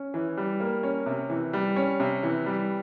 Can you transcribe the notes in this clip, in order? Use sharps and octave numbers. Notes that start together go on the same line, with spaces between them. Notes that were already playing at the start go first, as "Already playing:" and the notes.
Already playing: C#4
E3
G3
A#3
C#4
C3
E3
G3
C#4
C3
E3
G3